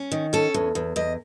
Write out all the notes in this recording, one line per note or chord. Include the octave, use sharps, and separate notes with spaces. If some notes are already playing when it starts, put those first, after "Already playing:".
Already playing: C#4
D#3
C#4 A4
E2
E2
E2 D#5